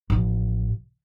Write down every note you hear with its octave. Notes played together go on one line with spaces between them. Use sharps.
A1 F3